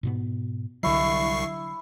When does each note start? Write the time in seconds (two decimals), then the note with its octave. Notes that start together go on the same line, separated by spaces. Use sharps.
0.03 G#2 B2 B3
0.83 C2 D3 F#3 E4 C#6 C7